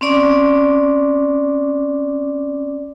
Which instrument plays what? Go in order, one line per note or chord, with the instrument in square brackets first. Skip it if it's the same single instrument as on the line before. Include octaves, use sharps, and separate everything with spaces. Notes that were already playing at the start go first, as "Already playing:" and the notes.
[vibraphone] C4 C#4 D5 D6